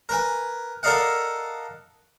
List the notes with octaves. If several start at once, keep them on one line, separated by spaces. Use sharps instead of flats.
A#4 B4 G#5
A4 A#4 D5 D#5 F5 F#5